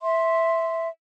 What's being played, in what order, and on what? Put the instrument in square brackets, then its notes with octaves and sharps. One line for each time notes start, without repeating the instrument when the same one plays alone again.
[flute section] E5 C6